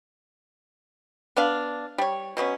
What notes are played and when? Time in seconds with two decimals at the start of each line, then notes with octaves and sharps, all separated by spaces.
1.36 B3 D4 F5
1.98 G3 C#5
2.37 B2 F#3 B3 C#4